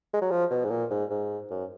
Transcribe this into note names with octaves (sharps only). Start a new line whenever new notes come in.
G#3
F#3
F3
B2
G#2
A#2
G#2
G#2
F#2